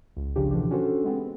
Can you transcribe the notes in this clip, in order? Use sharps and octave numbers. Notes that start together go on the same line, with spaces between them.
C#2
G#1 C#3 F3 D4 G4
B2 D3 E3 F3 D4 G4
C#4 D4 F#4 G4 A4 C5
G#3 B3 C4